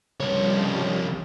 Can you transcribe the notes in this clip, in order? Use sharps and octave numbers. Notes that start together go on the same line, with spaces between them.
C2 C#3 F3 G3 C#5